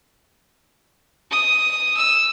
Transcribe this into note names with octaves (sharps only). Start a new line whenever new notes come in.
D#6
E6